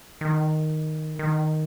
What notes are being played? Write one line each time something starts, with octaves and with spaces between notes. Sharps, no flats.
D#3
D#3